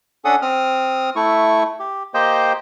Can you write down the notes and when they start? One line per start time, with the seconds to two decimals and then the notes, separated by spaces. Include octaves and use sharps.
0.25 C#4 D4 A4 F#5 D#6
0.42 C4 D#6 F6
1.16 A3 E4 C#6
1.80 G4
2.14 A#3 G4 C5 D#5 G5